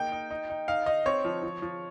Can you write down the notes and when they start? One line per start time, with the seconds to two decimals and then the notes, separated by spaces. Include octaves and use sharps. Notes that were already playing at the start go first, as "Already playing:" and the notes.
Already playing: A#3 D#4 G5
0.12 D#4
0.31 D#4
0.50 D#4
0.68 D#4 F5
0.86 D#4 D#5
1.06 C4 C#5
1.25 F3
1.43 F3
1.62 F3